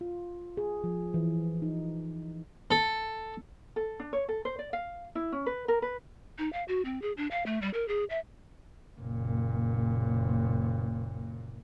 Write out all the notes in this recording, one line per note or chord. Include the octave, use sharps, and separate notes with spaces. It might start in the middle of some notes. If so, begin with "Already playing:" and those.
F4
G#4
F3
E3
D#4
A4
A4
D4
C#5
A4
C5
D5
F5
E4
C#4
B4
A#4
B4
D#4
F5
F#4
C4
G#4
D4
F5
A3
G3
A#4
G#4
E5
F#1 A#2